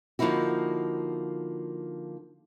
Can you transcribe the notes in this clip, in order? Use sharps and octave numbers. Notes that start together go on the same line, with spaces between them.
D3 F3 A#3 D#4 E4 F#4